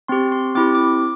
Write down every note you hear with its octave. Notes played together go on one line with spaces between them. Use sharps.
C4 G4 C6
C6
C4 E4 G4 D6
D6